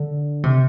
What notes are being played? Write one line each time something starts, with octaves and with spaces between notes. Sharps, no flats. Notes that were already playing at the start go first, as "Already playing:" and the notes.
Already playing: D3
C3